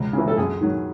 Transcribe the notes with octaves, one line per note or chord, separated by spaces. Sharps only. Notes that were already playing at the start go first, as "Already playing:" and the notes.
Already playing: C#2
C#3
E3
A4
F#2 G#4
D#3 F#3